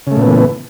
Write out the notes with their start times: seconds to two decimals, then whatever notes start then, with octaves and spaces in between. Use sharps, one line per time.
0.07 C#3
0.12 A3
0.17 A#2
0.22 B3
0.27 E3